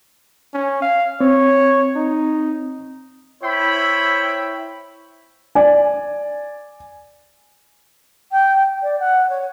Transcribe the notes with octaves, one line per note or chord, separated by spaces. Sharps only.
C#4
F5
C4 C#5
D#4
E4 C5 C#5 E5 G5 B5
D5 G#5
G5
D5
F#5
C#5